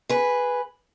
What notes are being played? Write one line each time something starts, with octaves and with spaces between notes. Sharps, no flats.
G#4 B4